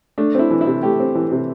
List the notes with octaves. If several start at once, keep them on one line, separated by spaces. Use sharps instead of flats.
A3 D4
C4 E4
E3
E4
C3
A3 G4
C4
E3
C3